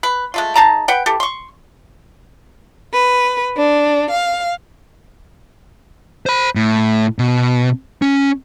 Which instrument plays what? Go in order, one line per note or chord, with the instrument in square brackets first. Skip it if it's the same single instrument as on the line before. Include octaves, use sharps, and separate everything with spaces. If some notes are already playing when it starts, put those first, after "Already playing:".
[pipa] B4
G#3 A3 F4
D#4 G#4 A5 A#5
B4 F#5 G5
E3 G4 A4
C6 C#6
[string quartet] B4
D4
F5
[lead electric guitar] C5 B5
A2
B2
C#4